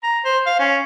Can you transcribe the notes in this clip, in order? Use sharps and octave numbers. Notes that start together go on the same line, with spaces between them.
A#5
C5
F5
C#4